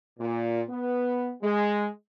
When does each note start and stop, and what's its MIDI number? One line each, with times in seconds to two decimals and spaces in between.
0.19 0.61 46
0.69 1.32 59
1.43 1.87 56